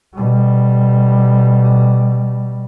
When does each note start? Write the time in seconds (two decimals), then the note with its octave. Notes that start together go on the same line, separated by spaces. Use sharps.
0.16 B2 G3